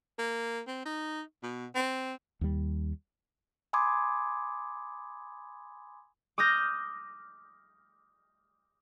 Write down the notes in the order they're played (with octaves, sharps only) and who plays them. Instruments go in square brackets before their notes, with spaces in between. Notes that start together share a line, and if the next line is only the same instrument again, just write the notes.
[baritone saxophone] A#3
C4
D#4
B2
C4
[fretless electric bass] D#2 G3
[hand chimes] G#5 B5 C6 D6 D#6 G#6
[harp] D6 D#6 F6 G6 A#6